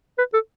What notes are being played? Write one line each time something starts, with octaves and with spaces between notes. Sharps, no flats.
B4
A4